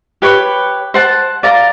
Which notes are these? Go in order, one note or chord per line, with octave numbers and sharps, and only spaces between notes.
G4 B4 C#5 B5
C5 F#5 A5
D5 F5 A#5